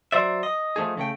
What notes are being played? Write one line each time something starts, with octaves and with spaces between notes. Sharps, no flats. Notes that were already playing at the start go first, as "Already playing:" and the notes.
F#3 C5 D5 E5
D#5
F3 A3 D#4 G#4
C#3 A3 G5